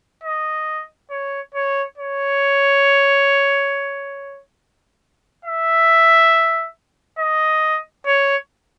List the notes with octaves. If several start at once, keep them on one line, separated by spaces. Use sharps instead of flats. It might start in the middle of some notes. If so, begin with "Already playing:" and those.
D#5
C#5
C#5
C#5
E5
D#5
C#5